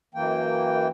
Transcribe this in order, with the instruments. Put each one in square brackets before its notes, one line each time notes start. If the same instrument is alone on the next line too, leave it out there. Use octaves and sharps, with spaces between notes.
[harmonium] F#2 E3 A#3 G5